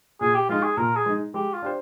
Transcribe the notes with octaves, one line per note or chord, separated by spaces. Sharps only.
A#2 G#4
G4
G#3 D#4 F4
G#4
A#2 A#4
G#4
G#3 D#4
G#3 G4
F4
D4 G4 C5